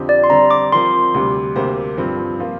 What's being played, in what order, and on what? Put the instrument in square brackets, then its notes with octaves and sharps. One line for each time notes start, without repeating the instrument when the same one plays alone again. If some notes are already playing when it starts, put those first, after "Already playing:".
Already playing: [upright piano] F2 D3 F3 C4 G4
[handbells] D5
C6
[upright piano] D3 G3 C4 [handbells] A#5
[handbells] D6
[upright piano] F3 C4 A#4 [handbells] C6
[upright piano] D2 C3 G3
D2 C3 A#3 G4 C5
G2 F3 C4
F3 A#3 F4